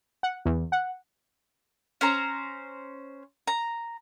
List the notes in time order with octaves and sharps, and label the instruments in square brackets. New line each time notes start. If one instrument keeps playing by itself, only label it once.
[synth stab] F#5
E2
F#5
[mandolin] C#4 C5 A#5
A#5